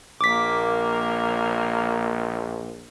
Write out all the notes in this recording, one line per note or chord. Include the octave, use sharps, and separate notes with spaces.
A#1 A#3 D6 B6